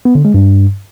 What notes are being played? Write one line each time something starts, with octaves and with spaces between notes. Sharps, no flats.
B3
D3
G#3
G2